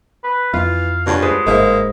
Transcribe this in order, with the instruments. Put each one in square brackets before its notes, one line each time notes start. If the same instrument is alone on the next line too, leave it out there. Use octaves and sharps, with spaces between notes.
[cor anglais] B4
[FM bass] F2 [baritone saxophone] E3 [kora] F4 [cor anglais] F5
[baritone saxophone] G2 [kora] C#4 F4 F#4
[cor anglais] G#3 [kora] G#4 B4 C5
[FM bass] G1 [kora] G#2 E5 [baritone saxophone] A#3